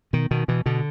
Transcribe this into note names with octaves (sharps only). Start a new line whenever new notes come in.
B2 D#3
B2 D#3
B2 E3
B2 D3